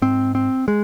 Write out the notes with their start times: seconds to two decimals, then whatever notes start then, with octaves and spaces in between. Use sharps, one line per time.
0.02 G#2 C4
0.35 C4
0.68 G#3